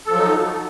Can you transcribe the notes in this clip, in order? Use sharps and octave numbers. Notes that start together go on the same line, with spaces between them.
F3 F#3 D#4 A4